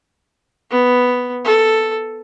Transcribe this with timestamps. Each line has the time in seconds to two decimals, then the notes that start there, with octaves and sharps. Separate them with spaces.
0.71 B3
1.45 A4